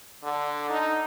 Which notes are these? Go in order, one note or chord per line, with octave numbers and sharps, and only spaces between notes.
D3
D#4